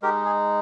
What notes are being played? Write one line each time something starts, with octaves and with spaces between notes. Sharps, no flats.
G#3 D#4 G4 A#4
G#4